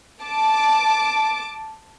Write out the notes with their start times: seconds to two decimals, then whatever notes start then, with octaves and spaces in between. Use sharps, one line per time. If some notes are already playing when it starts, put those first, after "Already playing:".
0.23 A5 D6